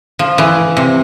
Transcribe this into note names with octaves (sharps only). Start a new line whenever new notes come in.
F3
E3
C3